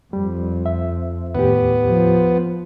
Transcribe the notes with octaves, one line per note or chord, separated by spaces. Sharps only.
F2 G3
E5
D#2 A2 B3 G4
F3